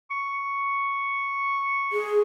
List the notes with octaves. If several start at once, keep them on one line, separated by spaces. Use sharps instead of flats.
C#6
G#4